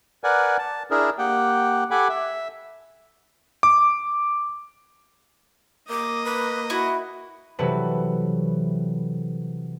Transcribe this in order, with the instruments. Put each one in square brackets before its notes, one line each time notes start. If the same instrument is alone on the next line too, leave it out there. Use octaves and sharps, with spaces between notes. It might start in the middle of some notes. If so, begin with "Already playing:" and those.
[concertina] A#4 B4 D5 F#5 G#5
A5
D4 E4 G#4 A#4
A#3 G4 F#5 G5
G4 A4 F#5 G#5 B5 D6
E5
[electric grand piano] D6
[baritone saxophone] A#3 [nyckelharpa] D#5 [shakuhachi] D6
[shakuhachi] B4
[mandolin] E4 [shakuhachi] F#4
[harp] C3 E3 F#3 G3 A4 B4